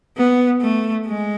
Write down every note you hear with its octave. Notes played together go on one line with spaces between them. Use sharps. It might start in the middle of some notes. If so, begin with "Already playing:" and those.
B3
A3
G#3